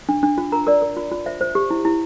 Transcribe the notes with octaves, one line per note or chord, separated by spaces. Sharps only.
D4
D4
F4
A#4 A#5
A#4 D5
A#4
F4
F4
C5 E5
C5
G4
E4
E4